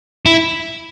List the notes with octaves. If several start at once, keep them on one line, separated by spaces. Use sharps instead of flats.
E4